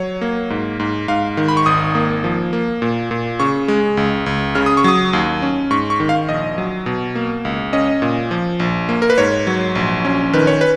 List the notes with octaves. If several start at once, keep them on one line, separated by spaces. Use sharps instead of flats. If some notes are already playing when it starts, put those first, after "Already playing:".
Already playing: F#3 C#5
A#3
G#2
G#2
G#2 F5
D#3
B5
C#6
G#1 D#6
A#3
F3
A#3
A#2
A#2
C#3 C#6
G#3
C#2
C#2
C#3 F6
D#6
C#6
F#3 D#6
D#2
C#4
G#2 C#6
C#6
D#3
F5
A#1 D#5
F#3
B2
A#3
C#2
C#4 D#5
A#2
F3
A#1
A#3
A#4
B4
G#2 C#5
F#3
A#1
C#4
D#3 B4
C#5
B4